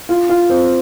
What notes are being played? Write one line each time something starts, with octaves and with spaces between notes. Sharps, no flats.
F4
F4
C4